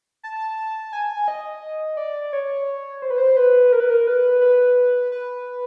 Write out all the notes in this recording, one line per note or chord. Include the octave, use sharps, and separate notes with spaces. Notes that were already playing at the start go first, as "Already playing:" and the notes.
A5
G#5
D#5
D5
C#5
C5
B4
C5
B4
A#4
B4
A#4
B4
B4
B4